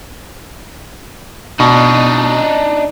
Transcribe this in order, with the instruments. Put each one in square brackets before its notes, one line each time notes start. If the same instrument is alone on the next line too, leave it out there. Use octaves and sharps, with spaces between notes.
[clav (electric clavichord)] B2 [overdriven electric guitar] D4 D#4